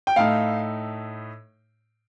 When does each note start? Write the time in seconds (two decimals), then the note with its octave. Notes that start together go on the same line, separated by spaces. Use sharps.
0.07 G5
0.16 A2 A3 D#4 F5